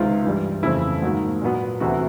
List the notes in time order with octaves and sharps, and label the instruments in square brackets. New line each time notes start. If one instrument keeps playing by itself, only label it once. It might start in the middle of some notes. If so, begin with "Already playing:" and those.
Already playing: [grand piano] C#2 C3 D#3 G#3 C4 F4
G2 E3 G3
F2 C#3 E3 A3 C4 E4
G#2 D#3 F#3 A#3
A#2 F#3 B3
D2 C3 E3 A3 F#4